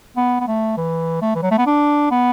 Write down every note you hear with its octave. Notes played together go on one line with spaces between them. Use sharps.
B3
B3
A3
E3
A3
E3
F#3
A3
B3
D4
B3